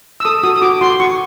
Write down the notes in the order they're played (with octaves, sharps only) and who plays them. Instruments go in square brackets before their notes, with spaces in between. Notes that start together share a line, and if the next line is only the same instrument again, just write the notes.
[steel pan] E6
A4 D#6
F#4 D#6
D#6
F#4 D6
F#4 C6
F#4 C#6